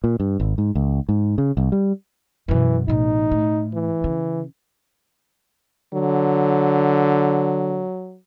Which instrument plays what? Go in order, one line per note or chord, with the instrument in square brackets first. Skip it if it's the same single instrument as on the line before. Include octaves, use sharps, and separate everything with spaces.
[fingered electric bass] A#2
G2
G#1
G#2
C#2
G#2
C#3
C2
G3
[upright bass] F#2 B2 [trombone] E3
[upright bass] A1 B2 [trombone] D#4
[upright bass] A2
[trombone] E3
[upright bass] C#3
[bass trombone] D3 [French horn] F#3